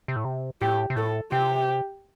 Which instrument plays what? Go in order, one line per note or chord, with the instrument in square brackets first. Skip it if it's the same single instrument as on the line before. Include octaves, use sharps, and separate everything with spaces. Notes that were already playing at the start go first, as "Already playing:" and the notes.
[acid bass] C3
A2
C3
[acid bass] A2 [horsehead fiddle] G4
[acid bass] C3
[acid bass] A2 [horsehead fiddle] A4
[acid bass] C3 [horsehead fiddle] G4